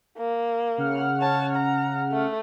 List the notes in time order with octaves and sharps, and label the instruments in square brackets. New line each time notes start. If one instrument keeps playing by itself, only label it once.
[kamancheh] A#3
[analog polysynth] C#3 F#5 F6
[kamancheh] C#5 A5
A#5
A3